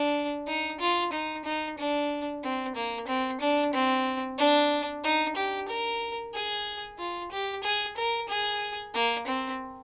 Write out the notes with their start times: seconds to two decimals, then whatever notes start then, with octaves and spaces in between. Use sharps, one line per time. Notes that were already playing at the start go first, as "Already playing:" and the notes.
Already playing: D4
0.47 D#4
0.80 F4
1.13 D#4
1.45 D#4
1.78 D4
2.43 C4
2.75 A#3
3.08 C4
3.41 D4
3.74 C4
4.38 D4
5.04 D#4
5.37 G4
5.68 A#4
6.34 G#4
6.99 F4
7.31 G4
7.63 G#4
7.97 A#4
8.29 G#4
8.94 A#3
9.27 C4